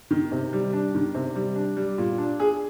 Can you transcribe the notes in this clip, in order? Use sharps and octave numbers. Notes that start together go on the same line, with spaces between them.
D#3
C3
G3
D4
D#3
C3
G3
D4
G3
A#2
D4
G#4